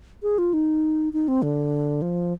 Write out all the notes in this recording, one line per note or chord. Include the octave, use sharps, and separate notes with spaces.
G#4
F4
D#4
D#4
C4
D3
F3